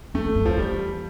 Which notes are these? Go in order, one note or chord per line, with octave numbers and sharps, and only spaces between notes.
E2 A3
F2
G2
E2 F3
G3